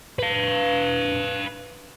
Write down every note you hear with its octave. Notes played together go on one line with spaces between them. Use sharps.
B4 F5